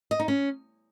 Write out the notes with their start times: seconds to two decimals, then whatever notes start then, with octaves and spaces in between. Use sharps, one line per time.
0.11 D#5
0.20 D#4
0.28 C#4